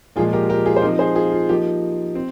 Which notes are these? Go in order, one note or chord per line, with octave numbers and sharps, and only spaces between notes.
A#2 F3 G#3 F4 G#4
G4 A#4
G4 A#4
F4 G#4
C5
F3 C4 D#4 G4 A#4
G#4 C5
F4 G#4
F4
F3 A#3 D#4 G4
C4